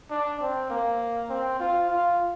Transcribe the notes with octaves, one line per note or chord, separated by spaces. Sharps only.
D4
C4
A#3
C4
F4
F4